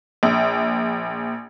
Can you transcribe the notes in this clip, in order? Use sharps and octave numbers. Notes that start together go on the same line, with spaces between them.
A#1